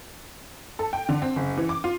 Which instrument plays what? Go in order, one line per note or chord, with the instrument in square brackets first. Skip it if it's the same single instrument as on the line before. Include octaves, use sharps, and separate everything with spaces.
[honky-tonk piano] A4
G5
D3
C4
F#1
E3
D6
F4